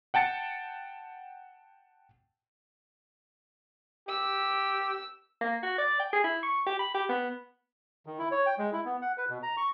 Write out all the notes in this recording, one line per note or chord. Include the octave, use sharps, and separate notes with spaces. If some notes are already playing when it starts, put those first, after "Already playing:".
F#5 G5 A5 A6 C#7
G4 E6
A#3
F#4
D5
G5
G#4
E4
C#6
G4
B5
G4
B3
D#3
E4
C#5
G5
G#3
E4
B3
F#5
B4
B2
A#5
C#6